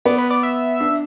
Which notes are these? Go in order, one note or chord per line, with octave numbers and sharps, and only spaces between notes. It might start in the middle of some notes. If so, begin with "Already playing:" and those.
B3 D5
B4
D5
E5
D4